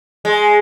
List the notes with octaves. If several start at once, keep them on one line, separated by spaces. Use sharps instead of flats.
G#3